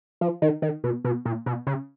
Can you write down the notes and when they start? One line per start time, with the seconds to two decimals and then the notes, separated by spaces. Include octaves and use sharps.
0.21 F3
0.42 D#3
0.62 D#3
0.84 B2
1.05 B2
1.25 A#2
1.46 B2
1.67 C#3